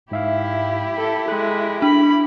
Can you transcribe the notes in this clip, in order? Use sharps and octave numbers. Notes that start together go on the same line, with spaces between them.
G#2 E4 G4 E5 F5
A4
G#3 A4 F#6
D4 B5